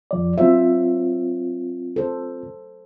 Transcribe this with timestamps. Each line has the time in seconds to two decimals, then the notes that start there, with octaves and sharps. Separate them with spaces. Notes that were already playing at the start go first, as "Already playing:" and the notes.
0.11 F2 F3 D5
0.38 F#3 C4 F4 C5 E5
1.96 A4 C5